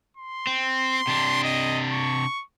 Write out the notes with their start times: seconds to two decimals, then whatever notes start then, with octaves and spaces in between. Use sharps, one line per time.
0.17 C6
0.47 C4
1.07 C3 D4
1.43 D#5
1.92 C#6